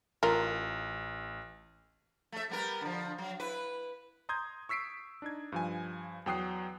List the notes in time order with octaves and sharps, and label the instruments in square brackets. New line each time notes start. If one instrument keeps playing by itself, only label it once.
[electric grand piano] A1 [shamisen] F4 A#4
[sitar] A3 E5
G3 B3 A#4
D3 F3
F#3
E4 B4
[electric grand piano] A#5 C6 D#6 G6 G#6
C#6 E6 B6 C7 D7
D4 D#4 G#6
G2 F3 G#5
E2 F#3 G5 D#6 F#6 C7